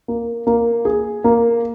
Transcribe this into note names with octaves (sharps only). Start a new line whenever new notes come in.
A#3
A#3
G#4
A#3